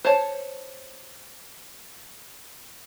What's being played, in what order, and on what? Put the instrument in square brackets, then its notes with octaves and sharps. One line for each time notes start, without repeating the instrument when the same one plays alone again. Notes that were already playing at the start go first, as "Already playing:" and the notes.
[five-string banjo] C5 C#5 A5